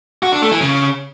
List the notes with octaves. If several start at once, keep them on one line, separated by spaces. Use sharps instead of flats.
F#4
D4
A3
E3
C#3